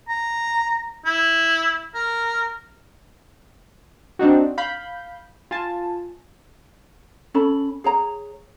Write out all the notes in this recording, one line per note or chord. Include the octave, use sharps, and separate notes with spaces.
A#5
E4
A#4
C4 D4 D#4 F#4
F5 B5 G6
F4 G#5 A5
C#4 A4 B5
G#4 C#5 A#5